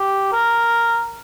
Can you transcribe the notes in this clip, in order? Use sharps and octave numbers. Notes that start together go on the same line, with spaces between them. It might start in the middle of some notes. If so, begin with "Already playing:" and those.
Already playing: G4
A#4